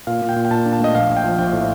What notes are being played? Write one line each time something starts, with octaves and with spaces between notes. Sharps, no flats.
A#2 F5
A#2
G5
A#2
G5
A#2 A5
D4
A5
A3 D#5
A#1 F5
A#1
G5
F3
A#1 G5
A2